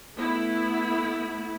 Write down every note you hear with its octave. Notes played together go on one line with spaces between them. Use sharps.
A3 B3 E4